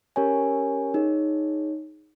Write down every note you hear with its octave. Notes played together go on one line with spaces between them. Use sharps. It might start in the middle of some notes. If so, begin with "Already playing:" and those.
C#4 G4 A#4 C#5 G#5
D#4 G#4 C#5